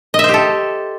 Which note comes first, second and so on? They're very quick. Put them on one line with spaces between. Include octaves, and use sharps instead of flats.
D#5 E5 C5 G4 A4